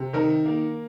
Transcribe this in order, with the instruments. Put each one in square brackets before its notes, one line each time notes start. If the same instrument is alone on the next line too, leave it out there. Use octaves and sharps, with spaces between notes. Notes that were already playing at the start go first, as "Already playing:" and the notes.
Already playing: [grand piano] C3
[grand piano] D#3 [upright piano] A#4
[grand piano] A#3